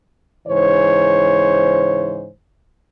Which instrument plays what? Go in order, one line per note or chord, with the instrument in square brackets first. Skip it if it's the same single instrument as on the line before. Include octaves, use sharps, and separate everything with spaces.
[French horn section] G#2 C#3 E3 C5 C#5